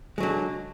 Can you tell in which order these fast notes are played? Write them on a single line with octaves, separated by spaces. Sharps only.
G#3 F#3 D3